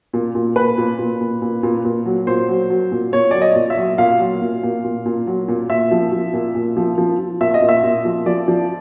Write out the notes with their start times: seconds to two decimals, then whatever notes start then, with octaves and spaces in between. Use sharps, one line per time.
0.13 A#2
0.35 A#2
0.56 A#2 B4
0.78 A#2
0.99 A#2
1.21 A#2
1.42 A#2
1.63 A#2
1.85 A#2
2.06 F#3
2.27 A#2 C5
2.49 F#3
2.70 F#3
2.92 A#2
3.13 A#2 C#5
3.31 F#3 D5
3.41 D#5
3.55 A#2
3.70 E5
3.77 F#3
3.98 A#2 F5
4.20 F#3
4.42 A#2
4.63 A#2
4.84 A#2
5.06 A#2
5.27 F#3
5.48 A#2
5.70 A#2 E5
5.92 F3
6.12 F3
6.34 A#2
6.55 A#2
6.77 F3
6.98 F3
7.19 F3
7.41 A#2 E5
7.54 D#5
7.62 A#2
7.69 E5
7.84 A#2
8.05 F3
8.26 F3 D5
8.48 F3